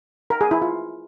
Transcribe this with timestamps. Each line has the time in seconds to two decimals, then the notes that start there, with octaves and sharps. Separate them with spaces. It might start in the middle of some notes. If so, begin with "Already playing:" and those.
0.30 A#4
0.41 G#4
0.51 E4
0.62 F4